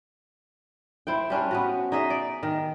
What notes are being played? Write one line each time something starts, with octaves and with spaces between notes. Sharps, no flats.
E4 C5 G5
G3 C#4 D4 C5
B3 C#4 F#4
D#4 G#4 D#5 E5
D5
D#3